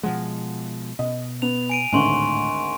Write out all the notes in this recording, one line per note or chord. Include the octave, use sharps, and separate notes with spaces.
B2 F3 G#3 F#5
B2 D#5
B3 F7
G#5 D7 D#7
G#1 D2 A2 G#5 C6 C#6